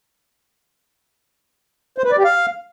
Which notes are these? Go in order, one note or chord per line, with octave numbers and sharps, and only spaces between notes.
C5
B4
D5
G4
F5